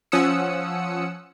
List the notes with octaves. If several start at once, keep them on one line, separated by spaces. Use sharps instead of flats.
F3 C#4 F#5 D#6 E6 C#7